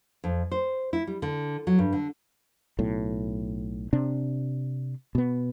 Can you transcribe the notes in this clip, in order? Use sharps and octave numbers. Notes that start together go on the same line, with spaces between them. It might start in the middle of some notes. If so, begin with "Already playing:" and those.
F2
C5
E4
G3
D3
F#3
G2
D3
B1 A2
C3 D4
B2 B3